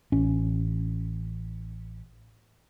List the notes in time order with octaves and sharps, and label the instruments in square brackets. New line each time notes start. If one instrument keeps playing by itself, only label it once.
[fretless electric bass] A1 C#4